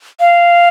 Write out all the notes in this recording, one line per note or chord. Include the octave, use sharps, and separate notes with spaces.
F5